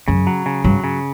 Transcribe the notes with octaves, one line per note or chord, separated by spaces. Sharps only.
F#2 C#3
F#3
C#3
G2 F#3
C#3